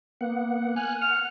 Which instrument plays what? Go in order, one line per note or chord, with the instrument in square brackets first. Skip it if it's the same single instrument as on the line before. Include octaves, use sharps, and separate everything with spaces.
[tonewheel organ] A#3 B3 F#5
[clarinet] G#5 [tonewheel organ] F6 F#6
[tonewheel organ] F#5 [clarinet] F6